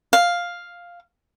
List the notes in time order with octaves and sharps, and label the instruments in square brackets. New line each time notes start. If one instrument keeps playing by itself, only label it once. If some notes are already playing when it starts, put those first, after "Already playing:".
[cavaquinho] F5